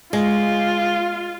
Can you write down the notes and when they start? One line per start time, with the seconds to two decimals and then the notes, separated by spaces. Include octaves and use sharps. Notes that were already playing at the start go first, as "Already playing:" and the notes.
0.13 G#3 F4